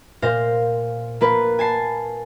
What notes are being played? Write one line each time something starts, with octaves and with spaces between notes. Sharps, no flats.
A#2 C5 F5 A#6
A#3 F4 B4
G#5 A5 C7